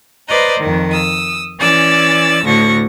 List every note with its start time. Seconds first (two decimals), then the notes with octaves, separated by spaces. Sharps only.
0.27 B4 C5 D5 D#5 A#5
0.59 F2 D#3
0.91 D#6 E6
1.59 E3 C#4 D5 E6 A6
2.45 D2 A2 D3 C#6 A#6